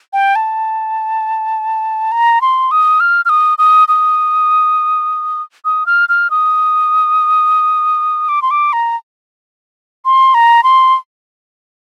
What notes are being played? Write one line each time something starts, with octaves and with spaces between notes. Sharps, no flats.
G5
A5
A#5
C6
D#6
F6
F6
D#6
D#6
D#6
D#6
F6
F6
D#6
D6
C6
D6
A#5
C6
A#5
C6